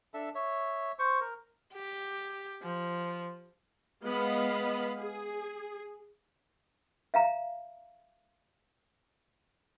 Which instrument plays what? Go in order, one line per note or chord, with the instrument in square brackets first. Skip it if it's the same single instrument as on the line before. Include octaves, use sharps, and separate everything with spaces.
[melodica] D4 A4 E5
C#5 E5
C5 C#6
A#4
[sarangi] G4
F3
[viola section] G#3 B3 D#5 F5 B5
G#4
[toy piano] E5 F5 A#5